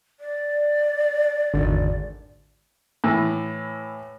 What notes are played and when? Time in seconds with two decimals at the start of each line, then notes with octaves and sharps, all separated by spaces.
0.20 D5
1.54 G#1 E2 D3
3.04 A2 E3